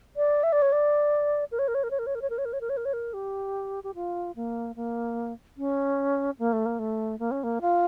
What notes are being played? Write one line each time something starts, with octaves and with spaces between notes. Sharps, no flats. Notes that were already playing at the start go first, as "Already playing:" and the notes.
D5
E5
D5
C#5
D5
A#4
C#5
A#4
C#5
A#4
C#5
A#4
C#5
A#4
C#5
A#4
C#5
A#4
C#5
A#4
C#5
A#4
C#5
A#4
G4
G4
F4
A#3
A#3
C#4
A#3
A3
A#3
A3
A#3
C#4
A#3
F4